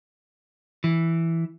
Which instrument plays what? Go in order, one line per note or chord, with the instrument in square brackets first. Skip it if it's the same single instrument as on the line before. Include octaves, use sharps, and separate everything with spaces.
[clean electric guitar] E3